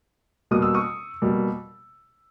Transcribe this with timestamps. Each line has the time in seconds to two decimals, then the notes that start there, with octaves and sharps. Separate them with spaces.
0.51 B2 G3 A#3 D#6
0.62 E6
0.74 C#6 D#6
1.22 B2 G3 A#3